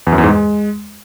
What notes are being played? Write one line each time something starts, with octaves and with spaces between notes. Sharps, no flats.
E2
F#2
E2
G#2
G#3